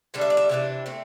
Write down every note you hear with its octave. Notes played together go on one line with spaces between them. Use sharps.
D3 G3 D4
E5
D5
E5
C3 E3 B3 D4
A3 C4